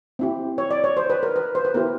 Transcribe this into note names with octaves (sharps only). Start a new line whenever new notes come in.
C4 E4 G4
C#5
D5
C#5
C5
B4
A#4
B4
C5
B4
B3 E4 G4 A#4